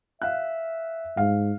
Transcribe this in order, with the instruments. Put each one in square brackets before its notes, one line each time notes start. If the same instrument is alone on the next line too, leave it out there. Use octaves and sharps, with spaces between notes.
[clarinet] E5 [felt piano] F5 F#6
[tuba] G#2 [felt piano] F5